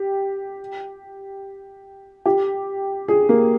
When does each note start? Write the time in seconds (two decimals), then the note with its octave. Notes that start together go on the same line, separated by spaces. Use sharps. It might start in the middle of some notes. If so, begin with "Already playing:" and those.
Already playing: G4
2.26 G4
3.08 G#4
3.29 A#3